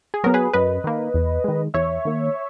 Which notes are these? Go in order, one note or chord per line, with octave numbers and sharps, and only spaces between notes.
G#4
F#3 B3 A#4
G#4 B4
F#2 B4 D#5
D#3 A#3
E2
D#3 G#3
E2 C#5 E5
D#3 A#3